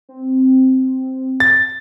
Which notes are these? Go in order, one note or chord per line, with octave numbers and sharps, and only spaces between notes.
C4
A6